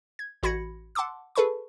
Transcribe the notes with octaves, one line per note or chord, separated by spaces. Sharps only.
G#6
A1 F#4 B5 G#6 A#6 C#7
F#5 A5 C6 D6 E6
G#4 A4 B4 A5 B5 C#6